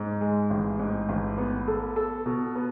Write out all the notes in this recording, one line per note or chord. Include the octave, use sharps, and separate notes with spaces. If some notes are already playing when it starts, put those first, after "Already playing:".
Already playing: G#2
G#3
A1
G#2
A1
B3
A4
A4
B2
B3